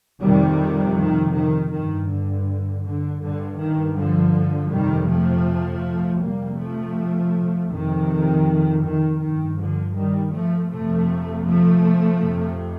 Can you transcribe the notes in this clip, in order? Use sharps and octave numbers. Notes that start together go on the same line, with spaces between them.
F2 C3 D#3 G3
D#3
D#3
G2 D#3
D3
D3
G2 D3
D#3
D3 F3
F2 C3 D#3 G3
F3 A3
F2 C3 G3 A#3
F3 A3
F2 C3 D#3
D#3
G2 D#3
D3 F3
D#3 G3
F3 A3
F2 C3 F3 A3
F3 A3
F2 C3